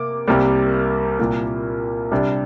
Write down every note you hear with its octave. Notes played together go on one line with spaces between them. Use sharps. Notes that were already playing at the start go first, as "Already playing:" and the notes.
Already playing: C3 A#3 D6
C2 C3 G3 A#3
C2 A#2 A#3
C3 G3 D4